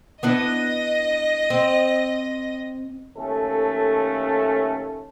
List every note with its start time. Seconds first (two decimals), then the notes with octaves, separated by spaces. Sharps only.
0.23 B3 D4 E4 D#5 A#6
1.50 C4
3.17 D#2 A3 C#4 A4